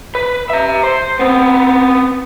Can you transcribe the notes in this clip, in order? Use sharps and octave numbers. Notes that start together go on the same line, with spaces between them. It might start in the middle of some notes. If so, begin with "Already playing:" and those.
B4
E5 A#5
C5
B3 C4